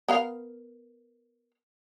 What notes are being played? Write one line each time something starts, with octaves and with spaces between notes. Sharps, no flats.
B3 A#4 F5